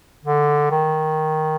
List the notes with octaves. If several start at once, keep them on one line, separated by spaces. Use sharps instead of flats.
D3
D#3